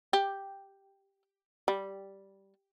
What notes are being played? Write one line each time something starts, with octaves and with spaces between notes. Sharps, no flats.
G4
G3